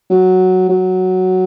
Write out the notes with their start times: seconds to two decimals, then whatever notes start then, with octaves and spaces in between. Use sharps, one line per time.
0.10 F#3
0.69 F#3